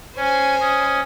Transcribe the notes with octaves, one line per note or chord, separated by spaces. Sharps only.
C#4 C5 G#5
C#4 D#5